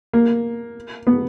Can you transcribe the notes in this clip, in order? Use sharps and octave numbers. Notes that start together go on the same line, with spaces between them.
A#3
B3